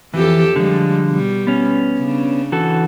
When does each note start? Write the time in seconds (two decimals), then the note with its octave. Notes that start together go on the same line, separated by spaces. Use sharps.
0.14 F2 E3 G4 A4
0.56 D3 F3 G3 G#3
1.08 B2 G3
1.47 B3 C#4
2.00 C#3 D4
2.52 E3 F#4 A4